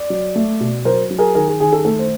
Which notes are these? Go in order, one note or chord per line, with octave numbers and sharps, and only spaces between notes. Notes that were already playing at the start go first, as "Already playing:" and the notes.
Already playing: D5
F#3
A3
B2
F#3 A#4 C5
F#3
G#4 A#4
D#3 G#4 A#4
G#4
D#3 G#4
A4
G#4
A3 A4
C5